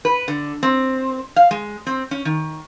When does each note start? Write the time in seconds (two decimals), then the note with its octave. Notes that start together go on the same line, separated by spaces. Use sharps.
0.05 B4
0.28 D3
0.63 C4
1.36 F5
1.51 G#3
1.87 C4
2.11 C#4
2.25 D#3